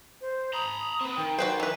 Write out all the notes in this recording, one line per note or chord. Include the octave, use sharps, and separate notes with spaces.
C5
A#5 B5 D#6
C4 B4
D#3 G5
F#4 B4 C5
E3 B4